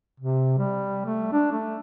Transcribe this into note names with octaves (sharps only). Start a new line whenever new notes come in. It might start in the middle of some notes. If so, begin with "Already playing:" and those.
C3
G3
A3
D4
A3